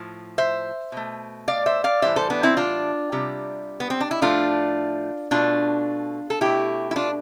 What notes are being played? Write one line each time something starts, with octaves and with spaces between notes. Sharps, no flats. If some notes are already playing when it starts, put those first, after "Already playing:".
Already playing: A2 F3
C5 E5
B2 A3
D5 F5
C5 E5
D5 F5
A2 E3 G3 C5 E5
A4 C5
B3 D4
C4 E4
D4 F4
C3 G3
B3
C4
D4
E4
A2 F3 A3 D4 F4
B2 A3 D4 F4
A4
B2 A3 E4 G4
E4
D4 F4